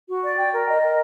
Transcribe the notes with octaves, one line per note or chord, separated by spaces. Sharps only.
F#4
D5
G5
A#4
D#5
A#4